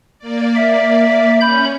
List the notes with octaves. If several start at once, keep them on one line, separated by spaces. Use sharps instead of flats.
A#3 D5
E5
C#4 B5 G6